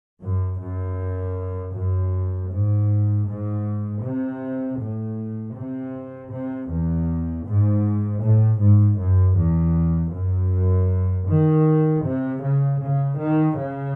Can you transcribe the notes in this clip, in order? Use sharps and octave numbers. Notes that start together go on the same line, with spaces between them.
F#2
F#2
F#2
G#2
G#2
C3
A2
C3
C3
E2
G#2
A2
G#2
F#2
E2
F#2
D#3
C3
C#3
C#3
D#3
C#3